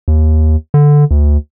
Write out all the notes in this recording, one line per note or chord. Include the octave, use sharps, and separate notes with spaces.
D#2
D3
D2